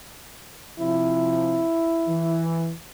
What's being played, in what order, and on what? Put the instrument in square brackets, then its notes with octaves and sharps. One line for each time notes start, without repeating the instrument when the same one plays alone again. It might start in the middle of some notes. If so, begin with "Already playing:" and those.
[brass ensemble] C3 F3 [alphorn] E4
[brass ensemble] E3